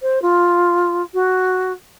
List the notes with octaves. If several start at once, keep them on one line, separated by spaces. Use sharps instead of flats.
C5
F4
F#4